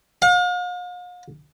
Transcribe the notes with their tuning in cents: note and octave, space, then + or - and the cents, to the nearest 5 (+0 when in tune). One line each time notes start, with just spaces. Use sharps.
F5 +45